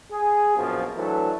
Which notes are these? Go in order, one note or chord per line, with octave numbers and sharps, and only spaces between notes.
G#4
A#1 F#2 B2 F3
E3 F#3 A3 D4 A4